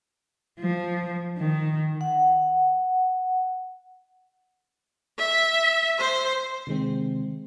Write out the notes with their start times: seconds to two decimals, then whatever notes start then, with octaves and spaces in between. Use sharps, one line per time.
0.60 F3
1.38 D#3
2.01 F#5
5.18 E5
5.99 C5
6.67 C3 D#3 G#3 C4